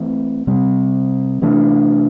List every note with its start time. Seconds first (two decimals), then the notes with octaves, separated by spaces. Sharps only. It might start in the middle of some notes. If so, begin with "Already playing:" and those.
Already playing: E3 A3 C4
0.47 C3 G3 C4
1.42 C3 E3 A3 D4